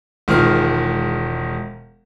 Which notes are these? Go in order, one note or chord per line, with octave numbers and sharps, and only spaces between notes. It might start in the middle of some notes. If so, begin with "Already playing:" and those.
E1 D#3 F3 G#3 F6